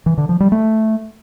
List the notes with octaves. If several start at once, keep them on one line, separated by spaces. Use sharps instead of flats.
E3
D3
F3
G3
A3